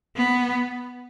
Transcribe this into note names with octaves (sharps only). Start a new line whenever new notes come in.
B3